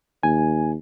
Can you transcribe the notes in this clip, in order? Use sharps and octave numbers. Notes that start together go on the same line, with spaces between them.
D#2 G#5